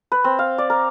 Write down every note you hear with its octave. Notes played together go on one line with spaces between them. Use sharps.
B4
C4
F5
D5
A#4